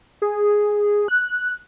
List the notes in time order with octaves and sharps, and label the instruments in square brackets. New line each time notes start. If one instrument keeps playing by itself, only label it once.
[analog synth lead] G#4
F#6